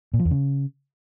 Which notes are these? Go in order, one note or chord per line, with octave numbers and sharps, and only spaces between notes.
A#2
F3
E2
C#3